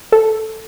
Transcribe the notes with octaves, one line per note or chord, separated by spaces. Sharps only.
A4